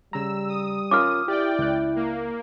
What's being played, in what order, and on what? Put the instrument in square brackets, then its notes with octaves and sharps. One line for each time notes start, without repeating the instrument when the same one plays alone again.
[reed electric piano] C#3 A#5 [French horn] G3 [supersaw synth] E6
[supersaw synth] D#6
[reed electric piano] C#4 F4 A#4 [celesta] D6 F6
[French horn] E4 [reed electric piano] G4 [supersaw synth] D5 G5
[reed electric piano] C#2 F#6
[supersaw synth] A#3